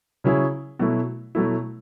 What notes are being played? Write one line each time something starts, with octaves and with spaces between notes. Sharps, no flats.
C#3 F#3 C#4 E4 G#4
B2 F#3 A3 E4
B2 F#3 A3 E4